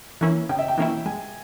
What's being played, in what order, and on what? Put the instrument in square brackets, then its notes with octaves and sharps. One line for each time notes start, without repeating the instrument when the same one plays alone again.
[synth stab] E3 A#3 C#4 E4
[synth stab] C#3 [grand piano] G5
[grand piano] E5
G5
[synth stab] E3 A#3 C#4 E4
[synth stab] G#3 [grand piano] G#5